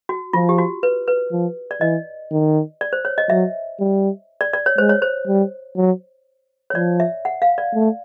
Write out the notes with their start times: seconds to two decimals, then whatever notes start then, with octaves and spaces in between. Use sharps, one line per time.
0.09 F#4
0.33 F3 F4
0.49 G4
0.58 F#4
0.83 B4
1.08 B4
1.32 F3
1.71 D5
1.81 E3 D#5
2.31 D#3
2.81 D5
2.93 C5
3.05 C#5
3.18 D#5
3.29 F#3 E5
3.80 G3
4.41 D5
4.53 D5
4.66 C#5
4.78 G#3 C5
4.89 C#5
5.02 C5
5.28 G3
5.77 F#3
6.70 C#5
6.75 F3 D5
7.00 E5
7.25 F#5
7.42 F5
7.58 D5
7.74 A3